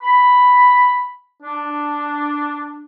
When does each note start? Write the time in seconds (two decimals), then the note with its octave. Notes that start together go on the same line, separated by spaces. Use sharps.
0.02 B5
1.42 D4